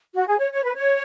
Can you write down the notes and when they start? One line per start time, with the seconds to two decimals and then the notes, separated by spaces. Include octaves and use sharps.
0.15 F#4
0.27 G#4
0.39 C#5
0.52 C#5
0.64 B4
0.76 C#5